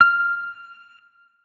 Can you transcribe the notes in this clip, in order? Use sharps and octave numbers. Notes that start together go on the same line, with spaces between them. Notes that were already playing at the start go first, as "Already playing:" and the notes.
F6